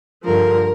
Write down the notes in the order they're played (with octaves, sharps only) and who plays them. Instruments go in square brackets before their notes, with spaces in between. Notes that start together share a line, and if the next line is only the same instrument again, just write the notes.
[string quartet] G2 D3 F3 A#4